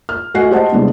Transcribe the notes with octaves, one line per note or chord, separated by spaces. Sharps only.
F6
A3 F#4 D#5 F#5 G#5 C7
G4 C5 D#5 F#5 A5
C3 E3 G3 G#3 B3 D4